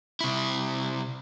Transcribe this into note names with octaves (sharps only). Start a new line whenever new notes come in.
C3 E4